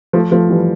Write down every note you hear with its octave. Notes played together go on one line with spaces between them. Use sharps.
F3 A3
F3 A3
E3 G3